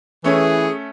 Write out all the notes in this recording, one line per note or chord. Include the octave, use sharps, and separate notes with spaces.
E3 A3 C#4 G#4